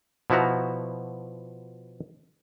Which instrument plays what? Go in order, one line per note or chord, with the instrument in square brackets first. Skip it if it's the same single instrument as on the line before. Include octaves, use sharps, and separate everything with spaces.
[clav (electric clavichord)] B2 F3 E4 F#4 A#5